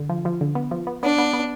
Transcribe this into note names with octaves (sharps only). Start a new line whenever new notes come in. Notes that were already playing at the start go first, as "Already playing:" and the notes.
Already playing: D3
F3
F3
D3
B3
F3
B3
B3 D4
B3
B3